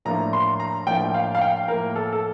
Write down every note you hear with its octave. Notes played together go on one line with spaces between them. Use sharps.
A2 F3 A#3 D4 A#5
C6
A#5
A2 F3 A#3 D4 G5
G5
F5
F5
G5
A2 F3 A#3 A#4
A4
A4